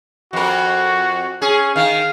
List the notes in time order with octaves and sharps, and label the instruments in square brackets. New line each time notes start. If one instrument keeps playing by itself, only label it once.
[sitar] F2 A#4 [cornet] F#4
[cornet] C#4 [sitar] G#4
[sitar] D#3 [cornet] F5